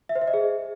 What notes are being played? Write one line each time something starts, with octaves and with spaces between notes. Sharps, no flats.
E5
C5
E5
D#5
G#4